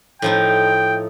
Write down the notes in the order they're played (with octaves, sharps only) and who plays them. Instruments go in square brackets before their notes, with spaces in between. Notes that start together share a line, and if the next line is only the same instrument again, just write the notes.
[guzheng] A2 F3 D#4 [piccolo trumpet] G5